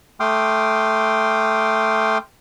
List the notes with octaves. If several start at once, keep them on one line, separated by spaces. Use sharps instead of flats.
A3 G5 C6 D6 D#6 F6